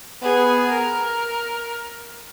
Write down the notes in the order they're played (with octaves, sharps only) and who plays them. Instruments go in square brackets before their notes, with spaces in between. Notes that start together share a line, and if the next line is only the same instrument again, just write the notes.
[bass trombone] B3 [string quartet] G#4
[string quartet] A#4